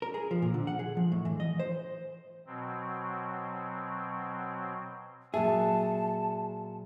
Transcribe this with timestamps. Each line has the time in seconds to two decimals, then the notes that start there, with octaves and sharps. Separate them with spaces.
0.02 A#4
0.14 G#4
0.31 F3
0.42 A#2
0.54 D3
0.67 F#5
0.79 G#4
0.97 F3
1.12 A2
1.25 E3
1.40 D#5
1.59 C5
2.46 B2 F#3 C4
5.34 A#2 F#3 G#4 E5 A5